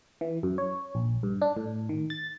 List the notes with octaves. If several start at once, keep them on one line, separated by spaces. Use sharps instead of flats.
E3
F#2
C#5
A#1
G2
D4
A2
D#3
A6